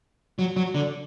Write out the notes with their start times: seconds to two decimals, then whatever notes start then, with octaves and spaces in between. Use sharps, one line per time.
0.39 F#3
0.56 F#3
0.74 D3